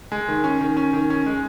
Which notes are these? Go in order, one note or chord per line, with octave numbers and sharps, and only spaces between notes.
G#3
D#3
C#4
D#3
C#4
D#3
C#4
G#3